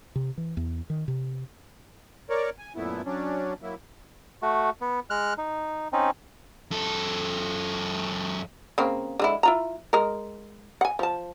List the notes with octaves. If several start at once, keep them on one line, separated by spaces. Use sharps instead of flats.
C3
E3
E2
D#3
C3
A#4 C#5 D5
G#5
F#2 A#2 A3 B3 E4
F#3 C#4 D4
F#3 A#3 E4
A3 F#4
B3
G#3 F6 F#6
D#4
C4 C#4 D#4
F#2 A4
C#3 A#3 C4
D3 G#3 E4
E4 F4 A#5
G#3 A#4
F#5 G#5
F3 A5